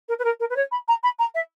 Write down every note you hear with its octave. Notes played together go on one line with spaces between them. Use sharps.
A#4
B4
A#4
A#4
B4
C#5
B5
A#5
B5
A#5
E5